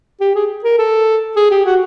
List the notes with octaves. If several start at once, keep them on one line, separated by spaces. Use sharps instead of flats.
G4
G#4
A#4
A4
G#4
G4
F#4